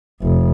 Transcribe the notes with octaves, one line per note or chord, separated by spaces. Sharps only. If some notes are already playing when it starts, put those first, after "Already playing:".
F1